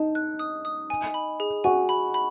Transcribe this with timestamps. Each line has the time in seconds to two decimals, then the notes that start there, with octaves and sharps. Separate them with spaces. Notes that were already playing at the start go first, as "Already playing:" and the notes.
Already playing: D#4 A5
0.15 F#6
0.39 D#6
0.65 D#6
0.90 G#5
1.14 B5
1.40 G#4
1.64 F#4 G#5
1.89 B5
2.14 B5